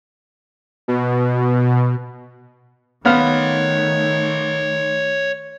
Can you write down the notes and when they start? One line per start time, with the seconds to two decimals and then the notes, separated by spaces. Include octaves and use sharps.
0.88 B2
3.06 D#3 A3 B3 C#5 F5 C6 F6